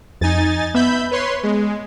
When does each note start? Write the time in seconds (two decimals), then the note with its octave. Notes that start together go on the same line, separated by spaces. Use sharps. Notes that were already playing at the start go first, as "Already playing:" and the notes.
0.21 F2 D#4 G#5 A6
0.75 B3 E5 B5 G6
1.11 B4 C#5 C6
1.43 G#3